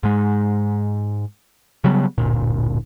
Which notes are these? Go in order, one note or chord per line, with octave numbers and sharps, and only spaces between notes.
G#2 G#3
C#3 F#3 G3 B3
D1 G1 A#2